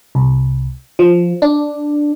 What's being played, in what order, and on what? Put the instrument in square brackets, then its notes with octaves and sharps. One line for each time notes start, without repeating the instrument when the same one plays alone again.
[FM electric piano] C2
F3
D4